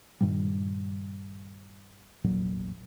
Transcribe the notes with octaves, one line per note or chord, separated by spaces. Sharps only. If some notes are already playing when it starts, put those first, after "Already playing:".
G2 A#2 D#3 G3
E1 A1 A#2 F#3